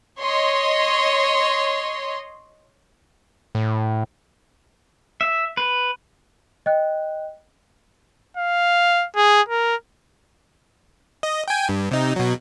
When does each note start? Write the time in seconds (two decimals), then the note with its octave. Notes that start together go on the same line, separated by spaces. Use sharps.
0.20 C#5 D#5 C6
3.55 A2
5.21 E5
5.57 B4
6.66 D#5 G5 F#6
8.37 F5
9.16 G#4
9.49 A#4
11.23 D#5
11.48 G5 G#5
11.69 G2
11.91 C3 D#4
12.16 B2 F#3